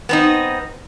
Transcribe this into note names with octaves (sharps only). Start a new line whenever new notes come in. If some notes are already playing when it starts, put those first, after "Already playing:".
B3 C4 D#4